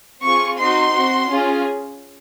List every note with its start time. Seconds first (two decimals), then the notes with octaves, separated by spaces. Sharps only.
0.23 C4 F4 G#4 C#6
0.58 C4 D#4 F#4 C6
0.93 C4 F#4
1.29 C#4 F4 G#4